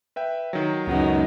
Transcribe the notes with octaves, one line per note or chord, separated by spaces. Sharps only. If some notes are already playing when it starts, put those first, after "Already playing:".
B4 E5 G5
D#3 F#3
C#2 F#2 B3 D#4